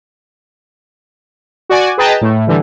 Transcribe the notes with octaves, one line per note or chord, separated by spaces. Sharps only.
F#4 D5 G#5
G#4 B4 D#5 G5 A5 A#5
A2 A3
D3 E3 G3